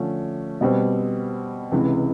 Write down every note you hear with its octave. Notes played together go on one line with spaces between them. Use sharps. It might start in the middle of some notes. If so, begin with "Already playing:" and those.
Already playing: D3 F3 A3 C#4
B2 G3 C4
C#2 C3 E3